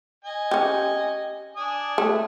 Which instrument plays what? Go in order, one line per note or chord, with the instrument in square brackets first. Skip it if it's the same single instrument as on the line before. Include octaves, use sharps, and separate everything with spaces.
[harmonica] D#5 G#5
[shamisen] C#4 G4
[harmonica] D4 G#5 D#6
[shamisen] A3